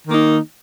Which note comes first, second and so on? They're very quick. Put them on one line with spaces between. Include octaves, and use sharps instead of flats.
D#3 A#3 D#4